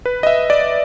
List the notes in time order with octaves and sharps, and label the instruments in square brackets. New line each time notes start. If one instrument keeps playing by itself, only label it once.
[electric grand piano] B4
D#5
E5
D5